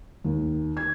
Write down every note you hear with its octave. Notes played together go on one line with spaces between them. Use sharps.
D#2
G#6